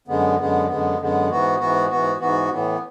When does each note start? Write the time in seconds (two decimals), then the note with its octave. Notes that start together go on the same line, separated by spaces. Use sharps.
0.08 F#2 D3 G#3 B3
0.38 F#2 D3 G#3 B3
0.68 F#2 D3 G#3 B3
0.99 F#2 D3 G#3 B3
1.29 G#2 E3 B3 F#4
1.59 G#2 E3 B3 F#4
1.89 G#2 E3 B3 F#4
2.19 G#2 E3 B3 F#4
2.49 A2 E3 B3